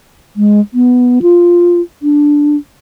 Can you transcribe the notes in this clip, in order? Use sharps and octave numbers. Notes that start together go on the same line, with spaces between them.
G#3
B3
F4
D4